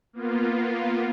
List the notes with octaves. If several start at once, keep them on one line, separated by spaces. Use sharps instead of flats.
A#3 B3 F4